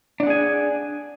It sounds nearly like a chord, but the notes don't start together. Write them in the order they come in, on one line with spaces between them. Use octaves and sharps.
D4 F#5 G#4 G#5